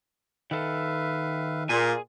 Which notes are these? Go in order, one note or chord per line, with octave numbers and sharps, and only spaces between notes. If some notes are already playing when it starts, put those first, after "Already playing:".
D#3 A4 B4 E5 F5
A#2 F4 G#4 G#5